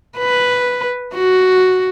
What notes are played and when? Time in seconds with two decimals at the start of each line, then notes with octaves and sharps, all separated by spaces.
0.18 B4
1.14 F#4